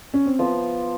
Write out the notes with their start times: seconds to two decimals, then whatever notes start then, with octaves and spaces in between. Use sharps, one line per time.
0.14 C#4
0.26 C4
0.39 F3 B3